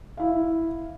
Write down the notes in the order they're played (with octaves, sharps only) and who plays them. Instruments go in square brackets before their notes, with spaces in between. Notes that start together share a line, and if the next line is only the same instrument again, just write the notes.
[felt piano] E4 F5